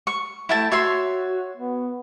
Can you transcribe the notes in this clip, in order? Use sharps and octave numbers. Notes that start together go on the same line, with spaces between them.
C#6
A3 E4 G5 A5
F#4 C#5 E5 C6
B3